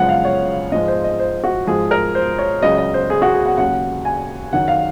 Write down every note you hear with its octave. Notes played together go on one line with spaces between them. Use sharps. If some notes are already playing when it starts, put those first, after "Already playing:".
Already playing: F#2 C#3 F3 G#3 F#5
F5
C#5
G#2 F3 G#3 D#5
C5
D#5
C5
F#4
G#2 F3 G#3 G#4
A#4
C5
C#5
C#2 C#3 F#3 D#5
D#5
C5
G#4
F#4
G#4
F#5
D#2 C#3 F#3 F#5
G#5
F#2 D#3 F#3 F#5
F5